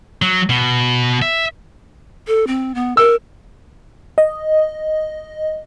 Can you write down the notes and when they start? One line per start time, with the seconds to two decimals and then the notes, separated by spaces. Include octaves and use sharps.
0.22 F#3
0.50 B2
1.22 E5
2.27 A4
2.47 C4
2.75 B3
2.97 A#4 E6
4.18 D#5